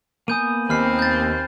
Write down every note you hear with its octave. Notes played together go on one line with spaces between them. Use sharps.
A#3 B3 G#5 D#6 G6 D#7
D#2 C4 B5 F6 C7
G6 A6